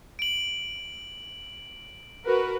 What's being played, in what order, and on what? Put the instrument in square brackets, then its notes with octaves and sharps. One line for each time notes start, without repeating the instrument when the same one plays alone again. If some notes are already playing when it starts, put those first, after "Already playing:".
[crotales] D7 F#7
[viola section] F#4 A#4 B4